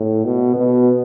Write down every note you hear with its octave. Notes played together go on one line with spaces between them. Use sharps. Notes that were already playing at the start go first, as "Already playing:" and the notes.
Already playing: A2
B2
B2